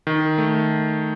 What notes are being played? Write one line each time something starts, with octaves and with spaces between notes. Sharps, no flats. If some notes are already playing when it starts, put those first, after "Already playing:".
D#3
A3